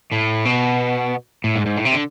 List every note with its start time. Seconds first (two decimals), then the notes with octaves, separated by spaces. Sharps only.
0.12 A2
0.45 B2
1.44 A2
1.56 G#2
1.66 G#2
1.77 A2
1.86 C3
1.94 D3